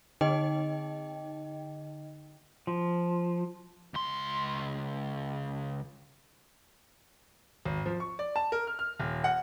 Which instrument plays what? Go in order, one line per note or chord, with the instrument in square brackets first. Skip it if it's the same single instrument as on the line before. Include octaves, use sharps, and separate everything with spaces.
[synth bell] D3 D#4 D#5 G5
[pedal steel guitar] F3
[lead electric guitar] C#2 C6
[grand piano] G#1
F3
C#6
D5
A5
A#4
F6
F6
D#1
F#5